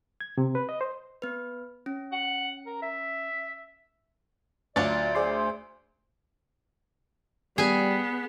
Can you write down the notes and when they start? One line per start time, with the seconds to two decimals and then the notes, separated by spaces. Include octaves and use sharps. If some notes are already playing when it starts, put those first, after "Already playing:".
0.21 G#6
0.38 C3
0.55 B4
0.69 D#5
0.81 C5
1.22 B3 B4
1.86 C#4
2.12 F#5
2.67 A#4
2.83 E5
4.76 D2 F#3 D4 F4 D5 A6
5.15 G#4 C5 D5 C6
7.58 G3 B3 G#4 G#5